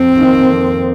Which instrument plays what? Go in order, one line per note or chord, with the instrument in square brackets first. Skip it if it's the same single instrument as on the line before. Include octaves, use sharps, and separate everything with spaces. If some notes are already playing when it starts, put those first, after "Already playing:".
Already playing: [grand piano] F2 [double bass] C4
[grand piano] D#3 A#3 D#4
F2